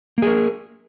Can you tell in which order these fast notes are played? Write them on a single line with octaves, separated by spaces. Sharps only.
A#3 G#4 A#4